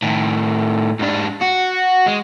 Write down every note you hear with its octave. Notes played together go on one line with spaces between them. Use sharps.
A2 D#3
G#2 D4
F#4
G#3